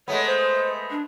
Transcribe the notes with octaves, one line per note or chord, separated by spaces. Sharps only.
G#3 A3 B3 C#5
C5
D4